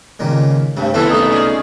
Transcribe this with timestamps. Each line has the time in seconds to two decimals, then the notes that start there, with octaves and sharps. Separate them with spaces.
0.19 C#2 A#2 D#3
0.77 G2 C3 A3
0.94 C2 D3 E3 A3 B3 E4 F4 A4
1.10 F#2 G#3 A3 D#4 E5
1.30 C#4 G#4 D5